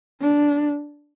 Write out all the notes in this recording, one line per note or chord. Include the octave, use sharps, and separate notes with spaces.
D4